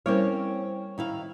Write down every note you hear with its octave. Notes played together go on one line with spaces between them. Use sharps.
G3 C4 C#4 E4 A#4 C#5
D#3 E4 F5